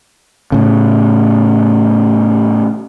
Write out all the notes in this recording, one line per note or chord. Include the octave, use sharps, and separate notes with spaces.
A2 C#3